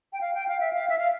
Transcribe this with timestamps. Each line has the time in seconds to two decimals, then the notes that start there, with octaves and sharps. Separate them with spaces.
0.13 G5
0.21 F5
0.34 G5
0.48 F5
0.60 E5
0.73 F5
0.90 E5
0.98 F5